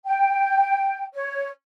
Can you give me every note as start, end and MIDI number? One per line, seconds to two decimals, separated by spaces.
0.05 1.04 79
1.14 1.48 73